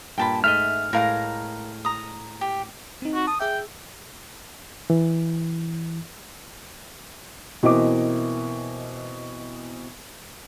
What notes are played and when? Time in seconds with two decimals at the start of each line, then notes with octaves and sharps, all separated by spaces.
0.18 G2 A#2 G5 A5 B5
0.44 G#2 A3 D#5 E5 F6
0.93 A2 G#3 A#4 F5 A#5
1.85 A#5 D#6
2.41 G4
3.02 C4 D#4
3.15 F#4
3.27 A5 D#6
3.40 G#4 E5 G5
4.90 E3
7.63 B2 E3 A#3 C4 D#5 D6